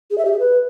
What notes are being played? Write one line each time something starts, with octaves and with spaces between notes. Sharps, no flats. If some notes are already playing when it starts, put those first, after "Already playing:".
G#4
E5
G4
G#4
B4